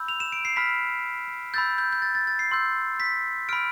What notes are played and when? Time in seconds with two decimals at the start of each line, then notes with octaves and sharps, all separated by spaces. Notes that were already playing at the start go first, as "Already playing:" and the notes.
Already playing: B5 E6 G6
0.08 F7
0.20 E7
0.32 D7
0.45 C7
0.56 B5 F6 B6
1.54 B5 E6 G6 A6
1.78 G6
1.92 G6
2.02 A6
2.15 A6
2.27 A6
2.39 C7
2.51 C6 E6 G6
3.00 B6
3.49 B5 F6 D7